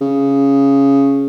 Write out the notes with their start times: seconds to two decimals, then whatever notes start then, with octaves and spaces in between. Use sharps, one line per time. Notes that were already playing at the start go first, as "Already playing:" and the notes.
0.01 C#3